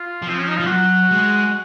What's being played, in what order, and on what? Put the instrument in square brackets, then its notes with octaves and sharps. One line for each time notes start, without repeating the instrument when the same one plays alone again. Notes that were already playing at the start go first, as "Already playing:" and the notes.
Already playing: [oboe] F4
[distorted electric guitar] F3
[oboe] C4
C#4
D#4
[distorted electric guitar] F3 [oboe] F4
[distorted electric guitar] F#3 [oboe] F#4
[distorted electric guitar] G#3